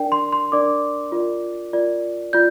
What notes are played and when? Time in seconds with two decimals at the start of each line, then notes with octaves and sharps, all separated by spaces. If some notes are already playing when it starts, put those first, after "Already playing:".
Already playing: D4 A#4 D5 G5
0.12 C6
0.33 C6
0.52 D4 A#4 D5 D6
1.12 F4 A#4 D5
1.73 F4 A#4 D5
2.33 F4 D5 G6